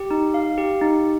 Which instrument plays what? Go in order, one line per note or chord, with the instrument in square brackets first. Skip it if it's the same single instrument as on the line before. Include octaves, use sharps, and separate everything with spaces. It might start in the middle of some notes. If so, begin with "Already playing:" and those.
Already playing: [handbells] G4
D#4
F5
G4
D#4